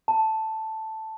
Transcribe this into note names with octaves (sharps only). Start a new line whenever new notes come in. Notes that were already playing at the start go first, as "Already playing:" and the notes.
A5